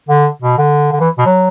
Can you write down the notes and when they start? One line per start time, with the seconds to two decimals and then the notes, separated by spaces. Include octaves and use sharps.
0.09 D3
0.42 B2
0.58 D3
0.92 D3
1.00 E3
1.18 B2
1.26 F#3